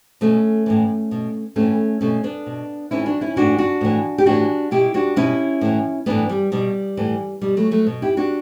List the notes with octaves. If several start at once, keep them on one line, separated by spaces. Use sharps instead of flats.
B2 A3 C#4
A2 E3
B2
A2 E3 A3 C#4
B2 A3 C#4
B3 D4
B2
A2 E3 C#4 E4
D4 F#4
C#4 E4
A2 E3 D4 F#4
D4 F#4
A2 E3
G4
A2 E3 D4 F#4
B2 E4 G4
D4 F#4
B2 C#4 E4
A2 E3
A2 E3 B3 D4
G3
B2 G3
A2 E3
B2 G3
F#3 A3
F#3 A3
B2
E4 G4
D4 F#4